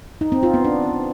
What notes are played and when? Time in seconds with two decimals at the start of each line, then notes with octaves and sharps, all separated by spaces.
0.21 D#4
0.32 C4
0.43 F4
0.54 B3
0.65 D4